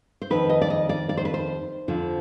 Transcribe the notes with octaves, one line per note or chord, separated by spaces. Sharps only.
C5
F2 D#3 B4
D#5
D5
D#5
D5
D5
C5
B4
C5
F2 D3 F3